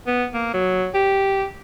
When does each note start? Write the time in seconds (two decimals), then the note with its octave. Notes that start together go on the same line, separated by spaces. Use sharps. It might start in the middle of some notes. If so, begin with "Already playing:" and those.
0.07 B3
0.34 A#3
0.54 F#3
0.94 G4